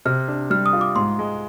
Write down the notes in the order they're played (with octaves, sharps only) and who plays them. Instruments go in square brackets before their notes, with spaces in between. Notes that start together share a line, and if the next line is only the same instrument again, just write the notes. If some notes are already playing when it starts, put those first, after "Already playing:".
[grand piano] C3 [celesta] F6
[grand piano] D4
[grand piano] G3 [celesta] F6
[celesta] D#6
[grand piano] F4
[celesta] D6
[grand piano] G#2 [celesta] C6
[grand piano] G#3